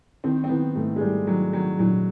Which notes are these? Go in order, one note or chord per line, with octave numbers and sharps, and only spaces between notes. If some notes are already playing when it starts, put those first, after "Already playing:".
D#3 C4
C4
D#3 B3
G#2 A3
G#3
G#2 G3
D#3 F#3
D#3 F#3
A#1 F#3